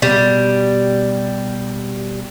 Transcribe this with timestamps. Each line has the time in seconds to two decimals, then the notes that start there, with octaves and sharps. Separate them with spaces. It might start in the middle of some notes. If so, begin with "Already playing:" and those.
0.02 B2 G3